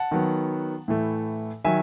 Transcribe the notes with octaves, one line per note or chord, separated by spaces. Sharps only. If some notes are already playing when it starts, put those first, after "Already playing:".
Already playing: F#5 A5
D#3 F#3 B3
A2 E3 A3
D#3 F#3 E5 G#5